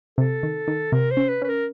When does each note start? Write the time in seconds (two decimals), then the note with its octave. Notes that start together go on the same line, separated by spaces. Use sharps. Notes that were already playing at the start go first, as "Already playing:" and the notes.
0.18 C3 A4
0.43 D#3
0.68 D#3
0.92 C3 A#4
1.11 C5
1.17 C#4
1.29 B4
1.42 C#4 B4
1.47 A#4